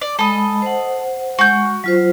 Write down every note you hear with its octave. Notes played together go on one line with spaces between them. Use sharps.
D5
G#3 A4 D#5 B5
C5 F#5
G#3 F#4 G6
F#3 F4 C5